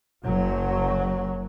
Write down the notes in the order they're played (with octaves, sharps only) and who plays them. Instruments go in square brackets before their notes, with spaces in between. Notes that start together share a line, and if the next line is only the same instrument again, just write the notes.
[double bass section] F#1 F#3